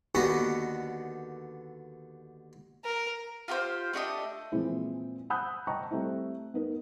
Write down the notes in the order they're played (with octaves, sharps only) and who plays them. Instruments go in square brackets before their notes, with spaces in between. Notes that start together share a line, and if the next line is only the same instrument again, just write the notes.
[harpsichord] D#2 D3 B3 F#4 D#5
[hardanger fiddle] A#4
[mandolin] F4 G4 A4 C5
A3 D4 G4 D#5
[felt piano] A#2 E3 F3 G#3 C4 E4
F#5 B5 D#6 E6 F#6 G6
D#5 G5 A5 A#5 C#6
G3 A3 C4 E4
B3 D#4 A#4